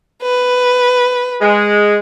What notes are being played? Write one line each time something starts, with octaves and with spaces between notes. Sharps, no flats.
B4
G#3